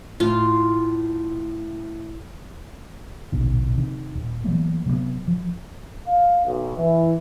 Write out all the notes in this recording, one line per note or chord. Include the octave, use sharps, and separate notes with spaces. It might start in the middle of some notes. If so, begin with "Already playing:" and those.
A2 F4
D1 A#1 B2 D#3
C3 D#3
D#1
E3 F#3 A#3 B3
C3 F#3 G3 B3
F3
F5
B1
E3